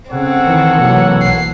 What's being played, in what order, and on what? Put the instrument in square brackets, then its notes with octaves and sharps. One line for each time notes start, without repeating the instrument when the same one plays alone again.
[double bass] C#3 [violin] C4 [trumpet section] A4 C#5 F#5
[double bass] D#3 E3
[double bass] C3 E3 [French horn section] F#3 A#3
[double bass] B1 [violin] C7